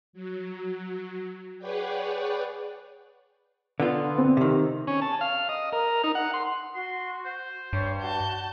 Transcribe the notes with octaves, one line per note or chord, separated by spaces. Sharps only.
F#3
G#4 B4 C#5 D5 F#5 G5
D3 B3 F4
C4
C3 D#3
C#4
A5
F5
D#5
A#4
D#4
F#5
C6
F#4 C6
C5
G2 C#5
F#4 A5 G6